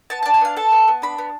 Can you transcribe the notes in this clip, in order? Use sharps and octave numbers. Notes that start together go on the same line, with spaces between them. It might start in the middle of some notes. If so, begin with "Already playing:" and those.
B3 A5
D4 A5
G#5
B3 F5
A4 A5
B3
B3
D4 B5
B3